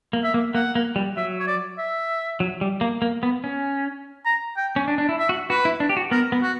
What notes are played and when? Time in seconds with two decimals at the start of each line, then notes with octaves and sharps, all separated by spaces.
0.13 A#3
0.23 E5
0.34 A#3
0.54 A#3 F#5
0.75 A#3
0.96 G3
1.17 F#3 E5
1.39 C#5
1.47 D5
1.78 E5
2.40 F#3
2.61 G3
2.81 A#3
3.02 A#3
3.23 B3
3.44 C#4
4.26 A#5
4.57 G5
4.76 C#4
4.88 D4
4.98 D4
5.09 E4
5.19 E5
5.29 F#4
5.50 F#4 B4
5.65 E4
5.80 D4
5.89 G4
5.97 F#4
6.11 B3 A#4
6.32 B3
6.43 F#4